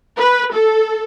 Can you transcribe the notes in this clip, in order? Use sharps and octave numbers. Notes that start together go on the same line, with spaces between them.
B4
A4